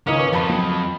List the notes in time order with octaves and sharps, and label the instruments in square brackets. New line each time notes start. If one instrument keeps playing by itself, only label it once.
[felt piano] C#2 G#2 D#3 [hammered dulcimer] A#3 D#5 [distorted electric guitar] C#4
[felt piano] B4 C#6 D6
[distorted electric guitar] F2 [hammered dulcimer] A5 B5
[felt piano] F#3